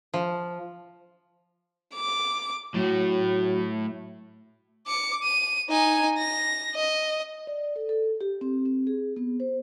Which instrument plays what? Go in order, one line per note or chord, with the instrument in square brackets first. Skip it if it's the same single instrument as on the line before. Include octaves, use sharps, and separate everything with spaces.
[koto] F3
[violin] D6
[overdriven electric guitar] A2 [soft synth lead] F#3
[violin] D6 C#7
D#7
D#4 G#5
A#6
D#5
[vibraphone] D5
A4
A4
G4
C4
C4
G#4
B3
C5